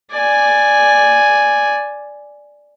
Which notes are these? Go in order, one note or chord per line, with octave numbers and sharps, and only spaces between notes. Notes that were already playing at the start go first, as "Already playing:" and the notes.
D5 G#5